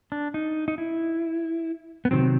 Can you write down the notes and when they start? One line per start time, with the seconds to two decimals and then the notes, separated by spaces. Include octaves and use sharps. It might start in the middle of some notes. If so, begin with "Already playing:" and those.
0.12 D4
0.34 D#4
0.68 D#4
0.78 E4
2.05 B3
2.11 C3 D#3 F#3 C4